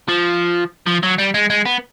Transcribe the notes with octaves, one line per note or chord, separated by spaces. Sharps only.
F3
F3
F#3
G3
G#3
G#3
B3